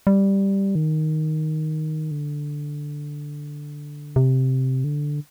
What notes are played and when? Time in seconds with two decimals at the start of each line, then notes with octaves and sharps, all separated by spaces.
0.07 G3
0.75 D#3
2.11 D3
4.16 C3
4.84 D3